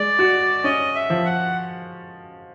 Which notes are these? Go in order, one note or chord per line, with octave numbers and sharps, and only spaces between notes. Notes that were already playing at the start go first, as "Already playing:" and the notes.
Already playing: G#3 D5
F#4
C#4 D#5
E5
F3
F#5